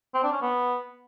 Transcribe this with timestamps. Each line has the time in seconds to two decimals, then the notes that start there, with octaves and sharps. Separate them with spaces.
0.15 C4
0.23 D4
0.32 C#4
0.41 B3